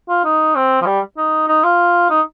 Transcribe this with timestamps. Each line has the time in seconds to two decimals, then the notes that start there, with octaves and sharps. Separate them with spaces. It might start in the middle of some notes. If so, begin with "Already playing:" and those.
0.09 F4
0.25 D#4
0.55 C4
0.82 F3
0.86 G3
1.17 D#4
1.48 D#4
1.64 F4
2.10 D#4